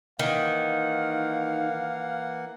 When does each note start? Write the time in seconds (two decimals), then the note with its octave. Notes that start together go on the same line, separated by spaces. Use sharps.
0.19 D#3 E3 A#3 F5 F#5